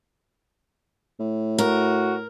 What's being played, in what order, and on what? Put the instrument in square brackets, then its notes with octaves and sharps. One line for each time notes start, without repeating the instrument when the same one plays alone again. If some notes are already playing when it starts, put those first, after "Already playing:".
[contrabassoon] A2
[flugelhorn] F#4 [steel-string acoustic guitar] A#4